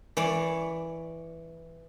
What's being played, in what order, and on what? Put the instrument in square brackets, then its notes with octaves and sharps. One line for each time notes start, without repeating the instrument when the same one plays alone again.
[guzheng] E3 C#5 D5